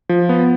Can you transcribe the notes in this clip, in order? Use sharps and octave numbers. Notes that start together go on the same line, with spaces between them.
F3
B3